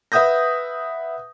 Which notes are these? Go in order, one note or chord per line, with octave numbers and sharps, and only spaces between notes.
B4 E5 F#5 D#6 G6 A#6